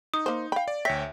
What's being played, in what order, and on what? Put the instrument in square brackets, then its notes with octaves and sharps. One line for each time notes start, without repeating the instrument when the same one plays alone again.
[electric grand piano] D#4 [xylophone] D#6
[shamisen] A#3 C5
[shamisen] F5 B5 [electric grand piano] G5
[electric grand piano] D5
[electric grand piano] D2 C#5 G5 [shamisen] E5 [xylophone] A#6 B6